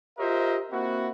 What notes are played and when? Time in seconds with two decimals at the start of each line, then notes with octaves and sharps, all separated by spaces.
0.18 F4 G4 A#4 C5 D#5 E5
0.71 A#3 C4 E4 F#4